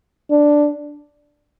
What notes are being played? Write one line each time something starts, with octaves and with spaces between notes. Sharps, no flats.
D4